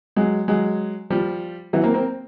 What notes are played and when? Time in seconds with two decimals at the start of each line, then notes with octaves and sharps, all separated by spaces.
0.16 F#3 G#3
0.48 F#3 G#3
1.10 F3 G3
1.73 E3 F#3
1.83 A#3 C4
1.94 A#3 C4